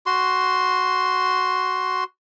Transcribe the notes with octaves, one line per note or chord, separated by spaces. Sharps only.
F#4 C6